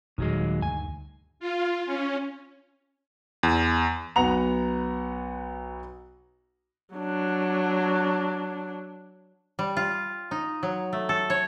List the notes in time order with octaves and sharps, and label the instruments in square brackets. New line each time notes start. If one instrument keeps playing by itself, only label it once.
[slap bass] D#1 A#2 [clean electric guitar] D#3 F#3 G#3
[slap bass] D2 G2 D#3 [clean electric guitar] G#5
[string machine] F4
C#4
[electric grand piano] E2
[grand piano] B1 B3 F#5 A#5 F7
[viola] F#3 D4
[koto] G3
F4
D#4
F#3
A3
A4
C#5